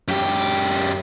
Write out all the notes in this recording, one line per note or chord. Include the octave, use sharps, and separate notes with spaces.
F#2 G4